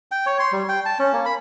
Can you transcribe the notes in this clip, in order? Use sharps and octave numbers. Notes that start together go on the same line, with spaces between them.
G5
C#5
C6
G3
G5
A5
C#4
A#3
B5